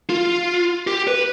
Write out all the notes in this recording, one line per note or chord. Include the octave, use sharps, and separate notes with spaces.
F4
G4
B4